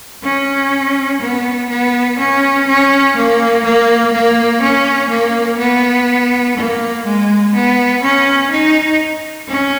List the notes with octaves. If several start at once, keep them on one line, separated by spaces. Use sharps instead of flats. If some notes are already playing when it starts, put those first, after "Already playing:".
C#4
B3
B3
C#4
C#4
A#3
A#3
A#3
C#4
A#3
B3
A#3
G#3
B3
C#4
D#4
C#4